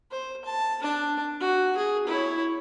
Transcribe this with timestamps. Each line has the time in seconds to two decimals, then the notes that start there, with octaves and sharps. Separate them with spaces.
0.11 C5
0.45 A5
0.81 D4 A5
1.40 F#4
1.77 G#4
2.07 E4 C#5